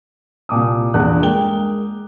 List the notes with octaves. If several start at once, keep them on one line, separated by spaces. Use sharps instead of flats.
C2 A#2 D6 D#6
A#1 E2 G2 A4 F#6
G#3 A#3 G5 G7